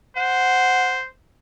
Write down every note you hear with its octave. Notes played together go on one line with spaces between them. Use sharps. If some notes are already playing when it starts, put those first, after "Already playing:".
C5 F#5